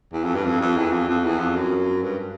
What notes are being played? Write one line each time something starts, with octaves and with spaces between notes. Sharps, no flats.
E2
F2
G2
F2
F2
E2
F2
F2
E2
F2
F#2
G2